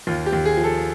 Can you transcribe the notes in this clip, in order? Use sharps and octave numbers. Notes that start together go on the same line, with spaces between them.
D#2 F4
G4
D#2
G#4
F3
A4